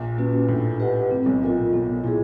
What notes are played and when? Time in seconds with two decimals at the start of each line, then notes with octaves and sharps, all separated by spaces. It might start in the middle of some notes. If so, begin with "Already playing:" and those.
Already playing: A#1 A#2
0.17 A#3 C#4 F#4 B4
0.48 A2 D4
0.80 G4 B4 D#5 F#5
1.11 A2 C4
1.26 B1 B2
1.42 A#1 A#2 F4 A#4 D#5
1.72 A#1 A#2 B3
2.03 A#2 E4 G#4